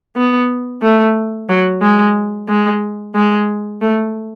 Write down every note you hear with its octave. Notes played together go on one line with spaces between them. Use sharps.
B3
A3
F#3
G#3
G#3
G#3
A3